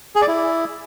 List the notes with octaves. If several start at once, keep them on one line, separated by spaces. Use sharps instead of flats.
G#4
D5
E4